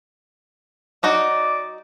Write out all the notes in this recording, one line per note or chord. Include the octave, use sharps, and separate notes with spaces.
F#3 D#4 F#4 D5 D#5 D6